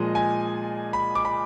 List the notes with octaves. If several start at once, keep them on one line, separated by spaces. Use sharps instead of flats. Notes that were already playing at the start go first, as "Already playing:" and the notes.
Already playing: A#2 F3 G#3 D#5
G#5
B5
D6
B5